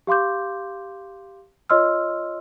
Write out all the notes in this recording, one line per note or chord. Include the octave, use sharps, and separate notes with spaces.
G4 F5 C6 D6 G6
F4 C#5 D#5 C6 E6 F6